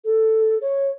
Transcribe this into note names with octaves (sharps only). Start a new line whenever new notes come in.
A4
C#5